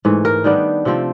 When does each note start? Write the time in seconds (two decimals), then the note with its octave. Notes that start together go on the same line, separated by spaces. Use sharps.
0.05 G#2 E3 A3
0.25 A#4
0.44 D#3 G3 B3 D4
0.85 C3 F3 A3 C4